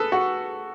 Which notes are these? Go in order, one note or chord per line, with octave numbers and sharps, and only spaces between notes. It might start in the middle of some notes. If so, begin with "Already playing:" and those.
Already playing: G#4 A4 B4
F#4